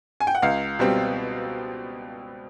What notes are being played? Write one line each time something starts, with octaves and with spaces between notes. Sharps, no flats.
G#5
G5
F#5
C#2 F5
B2 G3 C4